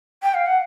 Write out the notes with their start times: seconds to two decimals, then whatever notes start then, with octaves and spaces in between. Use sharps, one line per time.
0.23 G5
0.34 F5
0.46 F#5